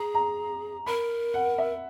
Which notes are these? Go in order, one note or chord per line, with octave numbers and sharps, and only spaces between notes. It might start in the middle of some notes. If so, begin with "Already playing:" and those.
Already playing: G#4 A#5
A#5
A#4 B5
F#5
E5